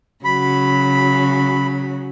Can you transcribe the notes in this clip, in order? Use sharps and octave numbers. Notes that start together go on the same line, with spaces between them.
C#3 F#3 B5